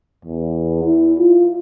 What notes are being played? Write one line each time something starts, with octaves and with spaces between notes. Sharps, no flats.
E2
E4
F4